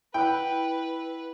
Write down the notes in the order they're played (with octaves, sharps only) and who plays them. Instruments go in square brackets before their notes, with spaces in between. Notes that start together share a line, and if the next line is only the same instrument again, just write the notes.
[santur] E4 F#5 [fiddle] B4 [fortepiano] G5